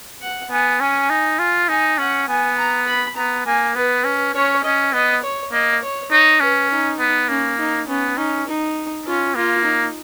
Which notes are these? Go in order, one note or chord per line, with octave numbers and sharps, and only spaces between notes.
F#5
B3 G#5
C#4 G#5
D#4
F4
D#4 G#5
C#4 F#5
B3 G#5
A#5
B5
B3 A#5
A#3 G#5
B3 B4
C#4
C#4 C#5
C#4 D#5
B3 D#5
C#5
A#3 D#5
C#5
D#4 C#5
C#4 B4
D#4
B3
A#3 C#4
D#4
B3 C#4
C#4 D#4
D#4
C#4 F4
A#3 F4
D#4